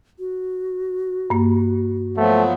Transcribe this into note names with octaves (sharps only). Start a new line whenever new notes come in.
F#4
G2 A#3
F3 F#3 A3 B3